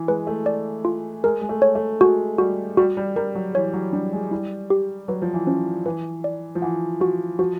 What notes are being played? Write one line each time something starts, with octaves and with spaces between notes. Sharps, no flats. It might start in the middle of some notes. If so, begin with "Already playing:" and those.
Already playing: E3
G#3 B4
A3
D5
F4
G#3 A#4
G#3
A3
C#5
A3
G#3 F#4
G3 F#4
G3 F#4
G3
G3 A#4
F#3
E3 C#5
F#3
G3 D4
G#3
G3 E4
G4
F#3 B4
F3
E3
F3 C#4
E3 B4
D5
F3
E3 F#5
F3 F#4
F3 F#4